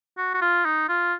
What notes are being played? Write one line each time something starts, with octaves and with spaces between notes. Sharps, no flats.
F#4
F#4
F4
D#4
F4